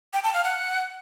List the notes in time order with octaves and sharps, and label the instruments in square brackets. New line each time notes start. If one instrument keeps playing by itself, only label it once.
[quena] G5
A5
F5
F#5